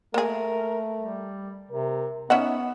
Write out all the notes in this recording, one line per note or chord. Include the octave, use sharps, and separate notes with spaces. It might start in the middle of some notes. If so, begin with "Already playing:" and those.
A3 A#3 G#4 A#4
G3
C3 A#4
B3 C#4 D#4 E5 F#5